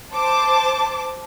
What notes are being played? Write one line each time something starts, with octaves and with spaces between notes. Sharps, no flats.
C5 A5 D6